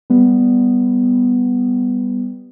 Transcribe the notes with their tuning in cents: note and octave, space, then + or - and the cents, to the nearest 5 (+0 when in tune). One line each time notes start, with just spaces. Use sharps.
G3 +0 B3 +0